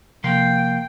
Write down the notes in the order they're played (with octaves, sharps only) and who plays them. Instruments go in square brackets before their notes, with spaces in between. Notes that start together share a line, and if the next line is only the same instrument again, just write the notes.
[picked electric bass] C3 F3 [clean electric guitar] A#3 C6 [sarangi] G5